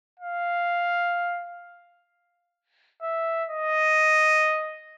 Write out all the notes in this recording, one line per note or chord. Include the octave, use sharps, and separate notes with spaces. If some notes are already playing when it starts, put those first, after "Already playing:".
F5
E5
D#5